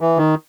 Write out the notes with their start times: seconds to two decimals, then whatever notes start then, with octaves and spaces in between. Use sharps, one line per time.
0.01 E3
0.18 D#3